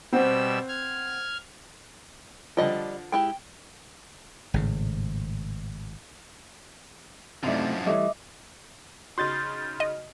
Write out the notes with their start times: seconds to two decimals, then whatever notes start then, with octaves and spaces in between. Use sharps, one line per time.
0.13 B2 G3 C4 C5 F#5 E6
0.68 F6 G#6
2.57 D3 F3 G3 D#5 G5
3.12 G#3 E4 G4 G5
4.54 G#1 A2 C#3
7.44 F#2 C3 F3 A3 D#4 E4 D5
7.86 E3 G3 A3 D#5 E5 D6
9.18 C#3 D#4 F#4 C6 G6 A6
9.80 D#5